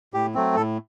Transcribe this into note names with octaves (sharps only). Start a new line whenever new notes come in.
A2 G4
F#3 A3 C4
A2 A4